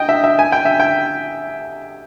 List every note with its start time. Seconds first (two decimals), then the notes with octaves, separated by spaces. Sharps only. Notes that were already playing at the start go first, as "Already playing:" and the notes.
Already playing: D#5 G5
0.09 E5
0.24 E5
0.39 G#5
0.52 G5
0.65 E5
0.80 G5